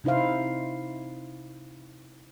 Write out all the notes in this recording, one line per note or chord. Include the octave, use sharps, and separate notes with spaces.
C3 D#4 E4 C5 F5